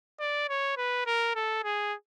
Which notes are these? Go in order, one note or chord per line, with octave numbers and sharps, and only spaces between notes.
D5
C#5
B4
A#4
A4
G#4